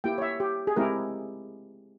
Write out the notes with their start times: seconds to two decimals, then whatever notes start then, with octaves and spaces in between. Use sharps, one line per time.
0.04 A#3 E4 G4 G5
0.18 C#5
0.22 E5
0.40 G4
0.67 G#4
0.76 G#3 C4 E4 G4 A#4